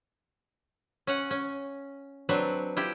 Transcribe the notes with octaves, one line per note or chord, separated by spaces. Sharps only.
C#4 F#5
C#4
F#3 C4 D4 B4
E4 F4 G4